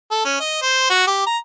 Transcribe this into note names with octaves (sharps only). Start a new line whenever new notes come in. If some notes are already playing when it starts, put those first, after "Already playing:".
A4
C#4
D#5
C5
F#4
G4
A#5